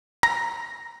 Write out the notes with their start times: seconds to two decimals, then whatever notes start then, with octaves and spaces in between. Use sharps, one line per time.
0.23 A#5